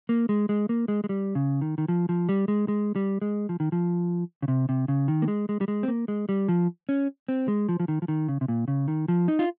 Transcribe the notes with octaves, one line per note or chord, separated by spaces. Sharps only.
A#3
G#3
G#3
A#3
G#3
G#3
G3
C#3
D#3
D#3
F3
F3
G3
G#3
G#3
G3
G#3
F3
D#3
F3
C#3
C3
C3
C#3
D#3
A#3
G#3
G#3
G3
G#3
C4
A#3
G#3
G3
F3
C#4
C4
G#3
F3
F3
D#3
F3
D#3
C#3
C3
A#2
C#3
D#3
F3
D#4
F4